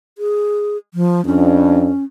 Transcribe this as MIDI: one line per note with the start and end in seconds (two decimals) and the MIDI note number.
0.18 0.77 68
0.94 1.24 53
1.26 1.89 41
1.26 2.04 61
1.26 1.89 62